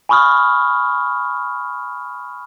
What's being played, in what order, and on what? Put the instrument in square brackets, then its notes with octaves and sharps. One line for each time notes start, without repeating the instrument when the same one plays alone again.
[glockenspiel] G#5 B5 C#6 D#6 F6